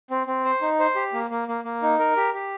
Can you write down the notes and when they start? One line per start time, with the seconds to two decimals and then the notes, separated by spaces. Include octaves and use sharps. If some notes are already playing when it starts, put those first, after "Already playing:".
0.10 C4
0.27 C4
0.45 C5
0.62 D#4
0.79 C5
0.96 G4
1.13 A#3
1.30 A#3
1.48 A#3
1.65 A#3
1.82 D#4
1.99 A#4
2.16 G4
2.34 G4